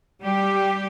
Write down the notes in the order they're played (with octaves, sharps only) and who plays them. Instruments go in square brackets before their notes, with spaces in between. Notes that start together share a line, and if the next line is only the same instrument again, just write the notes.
[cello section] G3 G4